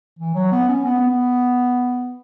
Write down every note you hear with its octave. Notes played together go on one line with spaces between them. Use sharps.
E3
F#3
B3
C#4
B3
B3